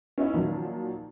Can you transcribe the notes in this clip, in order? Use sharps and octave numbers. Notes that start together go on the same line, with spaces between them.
C#4 D#4 E4
A#2 D#3 F3 F#3